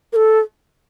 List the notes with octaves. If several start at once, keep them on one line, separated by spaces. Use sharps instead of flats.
A#4
A4